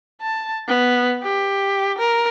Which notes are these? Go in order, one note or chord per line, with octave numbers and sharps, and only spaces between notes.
A5
B3
G4
A#4